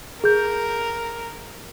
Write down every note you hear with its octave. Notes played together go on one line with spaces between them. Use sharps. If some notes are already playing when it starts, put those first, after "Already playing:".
G#4 A#4 G6